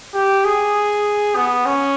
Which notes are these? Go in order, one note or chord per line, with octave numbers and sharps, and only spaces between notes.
G4
G#4
B3
C#4